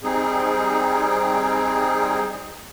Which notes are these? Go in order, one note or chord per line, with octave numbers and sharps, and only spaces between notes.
G3 C4 D#4 G#4